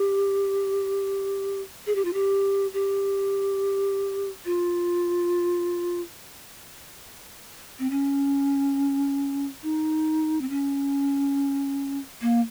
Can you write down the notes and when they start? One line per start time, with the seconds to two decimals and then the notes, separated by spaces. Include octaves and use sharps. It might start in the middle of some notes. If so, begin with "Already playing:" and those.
Already playing: G4
1.86 G#4
1.95 G4
2.05 F4
2.13 G4
2.74 G4
4.45 F4
7.79 C4
7.90 C#4
9.63 D#4
10.41 C4
10.50 C#4
12.21 A#3